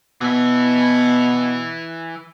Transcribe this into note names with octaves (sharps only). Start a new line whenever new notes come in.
B2 E3 E4